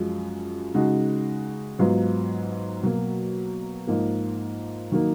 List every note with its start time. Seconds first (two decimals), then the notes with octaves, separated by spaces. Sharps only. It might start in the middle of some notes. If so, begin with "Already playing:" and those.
Already playing: F#2 F3 G#3
0.74 C#3 G#3 D#4 F#4
1.79 G#2 F#3 B3 F4
2.83 B2 F#3 A#3
3.87 G#2 F3 A#3 D#4
4.92 D#3 F#3 A#3 D#4